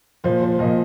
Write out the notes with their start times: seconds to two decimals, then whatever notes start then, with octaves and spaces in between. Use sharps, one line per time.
0.24 A#2 F3 C5
0.42 C5
0.59 A#2 F3 D#5